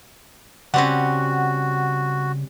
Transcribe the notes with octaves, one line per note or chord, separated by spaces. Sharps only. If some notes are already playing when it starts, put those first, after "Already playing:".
C#3 G3 C4 C#4 F#4 F#5